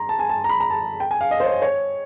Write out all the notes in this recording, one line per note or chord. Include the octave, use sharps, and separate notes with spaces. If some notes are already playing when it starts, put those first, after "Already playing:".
Already playing: A#5 C6
A5
G#5
A5
A#5
B5
A#5
A5
G5
G#5
F5
D#5
C5
C#5
C#5